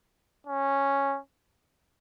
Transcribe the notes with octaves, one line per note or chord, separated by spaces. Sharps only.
C#4